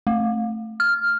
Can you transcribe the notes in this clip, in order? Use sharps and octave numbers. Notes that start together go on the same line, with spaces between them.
A3
F6